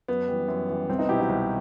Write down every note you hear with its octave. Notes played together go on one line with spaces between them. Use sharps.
F#2 B3
E3 G3
F#2
E3 G3
C2 C4
B3 D#4
B2 F#3 E4 G4
D#4 F#4
C2